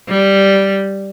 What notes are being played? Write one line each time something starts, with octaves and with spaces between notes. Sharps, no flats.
G3